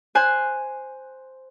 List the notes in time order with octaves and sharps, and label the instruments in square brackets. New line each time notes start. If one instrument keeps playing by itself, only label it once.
[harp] C5 G#5 F#6